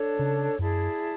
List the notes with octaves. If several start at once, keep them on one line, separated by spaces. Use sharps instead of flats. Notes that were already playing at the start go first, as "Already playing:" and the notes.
Already playing: D4 A4 C#5
C#3
F#2 E4 G#4 D5 A5